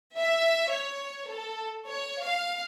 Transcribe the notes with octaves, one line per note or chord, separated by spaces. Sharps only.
E5
C#5
A4
C#5
F5